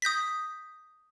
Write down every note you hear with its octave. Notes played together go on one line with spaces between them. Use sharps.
D#6 G6 A#6 B6